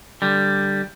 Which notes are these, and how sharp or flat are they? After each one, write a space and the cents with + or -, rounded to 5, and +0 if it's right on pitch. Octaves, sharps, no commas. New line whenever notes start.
D3 +0 G3 +0